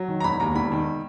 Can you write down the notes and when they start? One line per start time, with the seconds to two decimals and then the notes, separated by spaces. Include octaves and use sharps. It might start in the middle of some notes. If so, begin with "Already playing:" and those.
Already playing: F#3
0.08 D#3
0.20 A#5
0.24 E1 B5
0.40 D#2 A#5
0.55 E1 B5
0.72 D#3